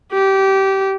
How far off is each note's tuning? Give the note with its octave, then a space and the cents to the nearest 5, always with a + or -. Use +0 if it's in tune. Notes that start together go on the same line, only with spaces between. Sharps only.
G4 -20